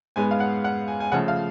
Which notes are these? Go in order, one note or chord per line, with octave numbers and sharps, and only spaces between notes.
G#2 G#3 B3 G#5
F5
F#5
F#5
G#5
G#5
C#3 F3 A3 F#5
F5